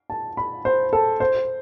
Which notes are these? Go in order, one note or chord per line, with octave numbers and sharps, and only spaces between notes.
A5
B5
C5
A4
C5